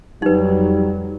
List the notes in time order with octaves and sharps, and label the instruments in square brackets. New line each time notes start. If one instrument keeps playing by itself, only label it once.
[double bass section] F2 F#3 [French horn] G3 [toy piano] D#4 B4